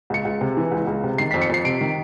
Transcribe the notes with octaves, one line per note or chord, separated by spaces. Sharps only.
C#2 C#7
C#2
C3
E3
C#2
C#2
C3
D#3 C7
F2 B6
C#7
F2 C7
C3 D7
D#3